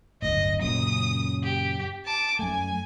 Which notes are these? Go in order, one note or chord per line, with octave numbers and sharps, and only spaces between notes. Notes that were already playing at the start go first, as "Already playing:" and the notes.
D1 G1 D2 D#5
F#2 A#2 C#3 D#6
G4
A5 D6
F#2 A3 G#5